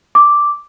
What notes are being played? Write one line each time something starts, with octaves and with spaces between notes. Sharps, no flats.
D6